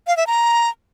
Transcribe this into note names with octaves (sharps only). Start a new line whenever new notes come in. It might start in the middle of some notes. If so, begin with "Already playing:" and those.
F5
E5
A#5